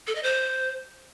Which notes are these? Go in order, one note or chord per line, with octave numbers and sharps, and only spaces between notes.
A4
D#5
C5